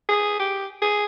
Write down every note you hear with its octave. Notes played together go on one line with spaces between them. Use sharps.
G#4
G4
G#4